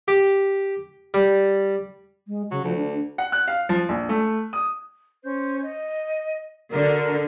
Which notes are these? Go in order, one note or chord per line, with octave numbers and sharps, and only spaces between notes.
G4
G3
G#3
C#3 F#3
D2 F3
D4
F#5
F#6
F5
F3
A#1
A3
D#6
C#4 C5 G6
D#5
D3 D4 F#4 A#4